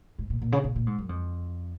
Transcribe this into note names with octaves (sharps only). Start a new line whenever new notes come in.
G#2
A#2
A#2
C#3
B2
A#2
G#2
F#2
F2